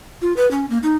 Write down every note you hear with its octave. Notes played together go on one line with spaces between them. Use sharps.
F4
B4
C#4
A#3
D#4